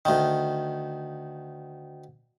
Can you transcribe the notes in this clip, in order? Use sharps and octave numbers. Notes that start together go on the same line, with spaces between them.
D2 D#3